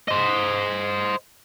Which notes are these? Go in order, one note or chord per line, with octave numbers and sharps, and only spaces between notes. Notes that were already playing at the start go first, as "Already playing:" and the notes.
C5 D#5